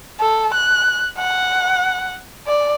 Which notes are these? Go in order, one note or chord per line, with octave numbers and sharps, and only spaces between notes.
A4
F#6
F#5
D5